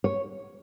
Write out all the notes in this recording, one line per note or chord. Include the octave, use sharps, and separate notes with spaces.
C#5